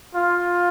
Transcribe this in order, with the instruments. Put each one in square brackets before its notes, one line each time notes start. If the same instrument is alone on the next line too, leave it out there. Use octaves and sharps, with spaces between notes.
[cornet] F4